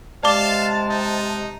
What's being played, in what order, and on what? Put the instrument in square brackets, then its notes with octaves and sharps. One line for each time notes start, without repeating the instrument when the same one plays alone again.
[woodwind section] C3 G#3 [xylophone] D5 D6 [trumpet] F5 [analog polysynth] A5
[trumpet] D#4